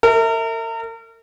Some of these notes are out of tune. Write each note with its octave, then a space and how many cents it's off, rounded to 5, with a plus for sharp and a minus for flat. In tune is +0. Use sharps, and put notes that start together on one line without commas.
A#4 -40 E5 -25